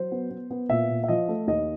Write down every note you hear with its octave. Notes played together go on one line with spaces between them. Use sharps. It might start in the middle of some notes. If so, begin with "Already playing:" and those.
Already playing: F#3 C5
B3
B3
B3
A#2 E5
A#2
E5
F3 D#5
A3
D#2 D#5